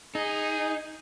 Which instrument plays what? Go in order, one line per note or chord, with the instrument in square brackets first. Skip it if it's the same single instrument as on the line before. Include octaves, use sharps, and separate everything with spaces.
[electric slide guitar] D#4 [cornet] G#4